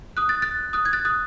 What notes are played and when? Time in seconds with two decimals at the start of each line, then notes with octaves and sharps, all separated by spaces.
0.17 D#6 F#6
0.29 F#6 A6
0.42 F#6 A6
0.73 D#6 F#6
0.85 G#6
0.93 F#6 A6
1.05 D#6 F#6